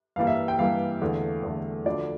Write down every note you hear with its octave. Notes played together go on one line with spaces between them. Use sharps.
G2 E3 G3 A#3 F5
E5
G5
G2 E3 G3 A#3 F5
E2 D3 A3
E2 D3 A3
D2 D3 F3 D5